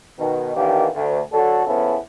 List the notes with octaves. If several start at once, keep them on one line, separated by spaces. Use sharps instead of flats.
B2 D#3
B1 D#3 E3 A#3 D4 G4
D2
D3 F#3 F#4 A4
C#3 F3 B3 C#4 E4 A4